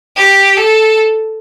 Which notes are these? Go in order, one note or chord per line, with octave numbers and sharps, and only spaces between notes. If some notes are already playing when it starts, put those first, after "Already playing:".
G4
A4